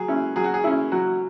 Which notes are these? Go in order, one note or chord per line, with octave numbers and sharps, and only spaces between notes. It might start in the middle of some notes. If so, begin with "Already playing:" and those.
Already playing: F#3 G#4
C#4 E4
F#3 G#4
F#4
G#4
C#4 E4
F#3 F#4